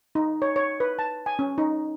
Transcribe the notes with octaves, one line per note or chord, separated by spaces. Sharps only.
D#4
C#5
C#5
B4
A5
G#5
C#4
D#4